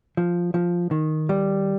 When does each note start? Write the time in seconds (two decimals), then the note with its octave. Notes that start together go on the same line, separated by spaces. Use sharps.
0.17 F3
0.54 F3
0.91 D#3
1.29 G3